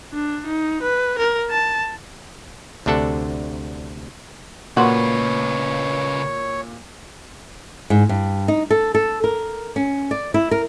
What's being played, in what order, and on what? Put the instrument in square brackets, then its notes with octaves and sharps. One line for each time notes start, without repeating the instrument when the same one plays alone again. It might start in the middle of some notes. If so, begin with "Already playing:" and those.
[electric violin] D4
D#4
B4
A#4
A5
[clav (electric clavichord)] D2 C3 D4 A4 F#5
[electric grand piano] A#2 A#3 [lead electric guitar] C#3 B4 [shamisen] F#4 [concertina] C#5
[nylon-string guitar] G#2
G2
D#4
A4
A4
A#4
C#4
D5
E4
A#4